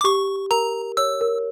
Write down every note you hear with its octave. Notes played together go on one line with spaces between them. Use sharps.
D6
G4 C#6
A#4 A#5
C#5 E6
A#4